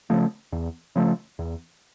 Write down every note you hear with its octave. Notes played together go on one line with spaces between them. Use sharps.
C#3 F3 A3
E2
C#3 F3 A3
E2